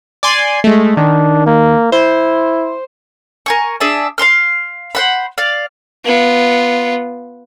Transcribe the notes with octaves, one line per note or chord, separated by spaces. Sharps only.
D5 G#5 C6
G#3 A3
D#3 D4
A#3
E4 C5
A#4 G#5 C#6
D4 G#4 E5 A5
F5 A#5 C6 F6
C5 F#5 B5
D5 F5
B3 F4